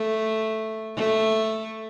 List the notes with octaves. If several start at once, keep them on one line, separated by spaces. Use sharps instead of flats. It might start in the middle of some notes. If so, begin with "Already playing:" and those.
Already playing: A3
A3